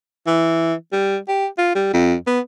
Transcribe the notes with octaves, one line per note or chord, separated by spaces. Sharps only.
E3
G3
G4
F4
G3
F2
B3